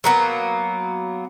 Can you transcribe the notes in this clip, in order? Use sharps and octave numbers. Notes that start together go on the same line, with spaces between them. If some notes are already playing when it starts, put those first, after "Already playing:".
F#3 A#3 B3